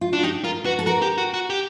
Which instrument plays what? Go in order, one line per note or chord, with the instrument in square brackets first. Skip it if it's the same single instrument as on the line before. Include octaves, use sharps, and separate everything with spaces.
[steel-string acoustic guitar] F4
[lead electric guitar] D4 [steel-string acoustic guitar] F#4
[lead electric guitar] D#4 [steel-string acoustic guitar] G4
[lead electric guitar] F4 [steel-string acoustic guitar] A#4
[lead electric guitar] F#4 [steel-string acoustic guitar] B4
[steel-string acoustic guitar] A4
[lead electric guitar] F#4 [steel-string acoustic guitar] A#4
[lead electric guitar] G4
F#4
F#4
G4